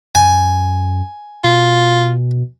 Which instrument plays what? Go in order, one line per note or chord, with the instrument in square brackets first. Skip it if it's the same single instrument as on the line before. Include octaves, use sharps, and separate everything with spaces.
[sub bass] F#2 [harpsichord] G#5
[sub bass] B2 [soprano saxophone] F4